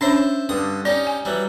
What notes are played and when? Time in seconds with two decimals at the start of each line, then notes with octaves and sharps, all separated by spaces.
0.01 C#4 D4 C5 C#5 E5 A5
0.49 G2 D3 D#6
0.85 C#4 D#4 G4 D5
1.07 G#5
1.25 E3 F#3 G3